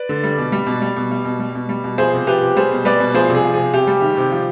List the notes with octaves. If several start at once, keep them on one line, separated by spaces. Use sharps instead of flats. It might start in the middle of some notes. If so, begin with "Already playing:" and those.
Already playing: B4 D5
D3
G3
B2
G3
B2
G3
B2
G3
B2
G3
B2
G3
B2
F3 G#4 C5
C3
F3 G4 B4
C3
G3 G#4 C5
B2
G3 B4 D5
B2
F3 G#4 C5
C3
G#4
F3
C3 G#4
C3 G4
G3
D#3
C3
F3